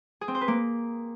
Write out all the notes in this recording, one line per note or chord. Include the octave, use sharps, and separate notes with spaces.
G#4
C4
C5
B4
A#3